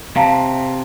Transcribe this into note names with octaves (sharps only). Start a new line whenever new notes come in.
C3 F5 A5 A#5